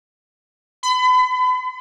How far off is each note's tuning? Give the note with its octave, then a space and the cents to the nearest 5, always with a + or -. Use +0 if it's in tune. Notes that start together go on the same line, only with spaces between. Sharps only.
B5 +35